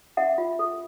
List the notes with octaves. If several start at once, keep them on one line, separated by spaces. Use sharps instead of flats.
C#4 E5 F#5
F4
A4